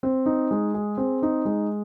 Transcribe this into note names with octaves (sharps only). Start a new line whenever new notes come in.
C4
D#4
G#3
G#4
C4
D#4
G#3